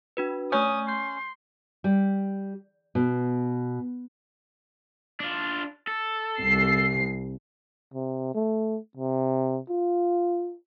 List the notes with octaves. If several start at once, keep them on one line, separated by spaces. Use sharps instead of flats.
D4 F#4 B4
A3 C#4 D#6 G6
C6 G6
G3
B2
D4 F4
A4
C2 C7
C3
A3
C3
F4